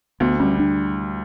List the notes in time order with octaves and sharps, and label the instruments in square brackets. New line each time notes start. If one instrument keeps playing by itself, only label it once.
[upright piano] D2 [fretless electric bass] B3
[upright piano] G3 [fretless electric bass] C#4
[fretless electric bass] D4